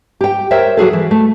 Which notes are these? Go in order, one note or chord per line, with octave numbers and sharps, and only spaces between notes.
G4 G5
A#4 C5 C#5 E5 G5
F#3 F#4 G#4 A4
E3
A3